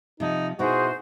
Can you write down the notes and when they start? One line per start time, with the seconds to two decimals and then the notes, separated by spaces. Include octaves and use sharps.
0.20 C3 F3 D#4
0.59 B2 D#4 E4 F#4 G#4 C5